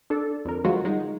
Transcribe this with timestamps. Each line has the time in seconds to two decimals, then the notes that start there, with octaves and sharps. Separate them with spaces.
0.10 D4 A4
0.45 F2 D3 A#4
0.64 D3 F3 F#3 G#3 F4 F#4
0.84 G3 G#3 D#4